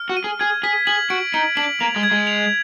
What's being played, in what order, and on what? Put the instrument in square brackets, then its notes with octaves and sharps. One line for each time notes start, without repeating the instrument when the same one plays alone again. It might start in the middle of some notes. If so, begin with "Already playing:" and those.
Already playing: [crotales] F6
[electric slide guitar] F#4
[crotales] D#7
[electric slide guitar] G#4
[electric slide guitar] G#4 [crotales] G#6
[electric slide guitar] G#4 [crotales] B6
[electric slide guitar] G#4 [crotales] F#7
[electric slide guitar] F#4 [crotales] D7
[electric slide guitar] D#4 [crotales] D7
[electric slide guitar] D4 [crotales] F#7
[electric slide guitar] A#3 [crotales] F7
[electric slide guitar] G#3
[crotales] G#6
[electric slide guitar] G#3
[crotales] F7